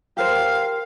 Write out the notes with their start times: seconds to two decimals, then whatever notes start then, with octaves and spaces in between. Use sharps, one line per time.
0.17 G4 A#4 C5 F5